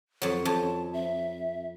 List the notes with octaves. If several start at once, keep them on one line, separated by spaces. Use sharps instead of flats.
F2 F#3
F2 A5
E5